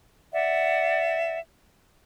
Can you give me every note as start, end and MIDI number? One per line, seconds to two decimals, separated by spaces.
0.32 1.38 74
0.32 1.38 76
0.32 1.38 78